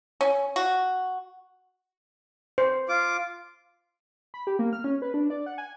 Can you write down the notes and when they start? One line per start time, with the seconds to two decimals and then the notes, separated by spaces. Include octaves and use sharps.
0.21 C#4
0.56 F#4
2.58 C5
2.89 F4 D6
4.34 B5
4.47 G4
4.59 A#3
4.73 F6
4.84 C#4
5.02 B4
5.14 D4
5.30 D5
5.46 F#5
5.58 G#5